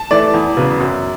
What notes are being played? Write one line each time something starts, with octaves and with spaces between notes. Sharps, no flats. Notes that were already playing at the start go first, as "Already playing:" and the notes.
Already playing: A5
E3 A3 D5
E2
C#3 F#3 B3
F#2